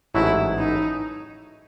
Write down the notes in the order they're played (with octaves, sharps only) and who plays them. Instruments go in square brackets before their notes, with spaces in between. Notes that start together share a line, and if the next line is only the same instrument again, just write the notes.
[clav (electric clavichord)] A1 G#2 F#3 A3 [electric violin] E4
[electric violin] D#4